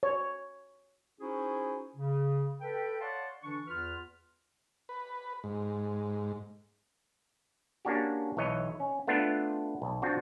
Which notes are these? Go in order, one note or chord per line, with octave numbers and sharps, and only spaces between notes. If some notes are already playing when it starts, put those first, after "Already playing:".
C#5
C#4 D#4 E4 F#4 G#4 C5
C#3
A4 B4 G5
C#5 D5 F5 F#5 A5 C6
D3 E3 D4 C#6
E2 F4 B4 F6
B4
G#2
A#3 C#4 D4 F#4 G4
B1 E3 C#5 D#5
C#4
A3 B3 D4 F4
B1
C4 D4 F4 F#4